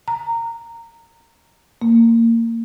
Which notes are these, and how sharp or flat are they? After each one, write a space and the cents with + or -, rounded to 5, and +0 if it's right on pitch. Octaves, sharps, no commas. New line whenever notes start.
A#5 -15
A#3 -25